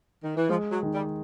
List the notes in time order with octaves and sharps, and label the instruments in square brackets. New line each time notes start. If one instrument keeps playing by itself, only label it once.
[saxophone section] D#3
E3
[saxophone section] F3 [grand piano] G#3
[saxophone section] F#3
[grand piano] D#3
[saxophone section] G3